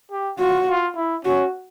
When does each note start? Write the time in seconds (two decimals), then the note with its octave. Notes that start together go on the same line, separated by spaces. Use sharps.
0.11 G4
0.39 F4 F#4
0.68 F4
0.96 E4
1.25 C#4 F#4